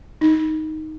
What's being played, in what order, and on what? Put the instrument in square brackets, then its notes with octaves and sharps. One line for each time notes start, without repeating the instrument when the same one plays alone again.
[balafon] D#4